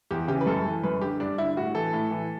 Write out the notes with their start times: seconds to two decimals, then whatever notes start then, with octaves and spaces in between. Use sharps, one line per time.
0.11 E2 G4
0.28 C#3 E3 G4
0.41 B4
0.46 F#2 A4
0.66 E3
0.84 F#2 B4
1.01 D3 G4
1.20 G2 D4
1.38 D3 E4
1.56 A2 F#4
1.75 E3 A4
1.93 A2
2.11 E3